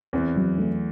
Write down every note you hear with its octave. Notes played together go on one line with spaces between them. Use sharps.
E2 E3 C4
F#3
A3